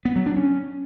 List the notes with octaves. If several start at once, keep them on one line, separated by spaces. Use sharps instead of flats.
B3
F#3
D4
C#4